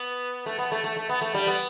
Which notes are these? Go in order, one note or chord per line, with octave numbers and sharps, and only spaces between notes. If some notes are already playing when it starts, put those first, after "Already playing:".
Already playing: B3
A3
B3
A3
A3
A3
B3
A3
G3
B3